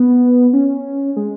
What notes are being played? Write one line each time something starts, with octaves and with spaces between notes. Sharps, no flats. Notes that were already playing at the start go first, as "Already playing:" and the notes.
Already playing: B3
C#4
G#3